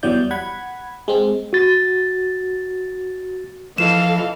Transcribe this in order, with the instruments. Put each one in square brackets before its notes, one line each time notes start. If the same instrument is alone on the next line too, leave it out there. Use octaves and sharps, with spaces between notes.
[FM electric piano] E2 E3 F#3 G3 D5 G6
F#5 B5 G#6
G#3 C4
[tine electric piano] F#4 A6
[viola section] E3 A4 F5 [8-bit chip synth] F3 F4 D#5 [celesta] E7